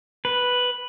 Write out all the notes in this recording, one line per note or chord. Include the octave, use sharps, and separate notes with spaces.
B4